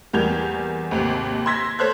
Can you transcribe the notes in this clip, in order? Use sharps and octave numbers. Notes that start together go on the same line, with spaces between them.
E2 G3 A#3 G6 G#6 F7
G#1 D#2 C3
C6 E6 G#6 A#6 B6
A4 C5 C#5 C6 F#6 G#6